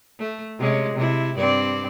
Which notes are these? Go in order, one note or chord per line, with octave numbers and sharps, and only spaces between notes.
A3
C3 G#3 C#4
C3 E4
G2 C4 D5